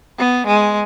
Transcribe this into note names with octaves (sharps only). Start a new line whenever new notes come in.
B3
G#3